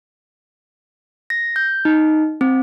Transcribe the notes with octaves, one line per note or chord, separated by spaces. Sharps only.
A#6
G6
D#4
C4